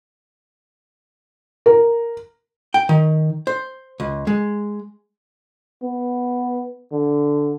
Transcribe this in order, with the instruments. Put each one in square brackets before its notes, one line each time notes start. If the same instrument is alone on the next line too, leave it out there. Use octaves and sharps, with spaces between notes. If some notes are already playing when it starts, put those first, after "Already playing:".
[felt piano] A#4
[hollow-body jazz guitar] G5
D#3
C5
C#2
G#3
[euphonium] B3
D3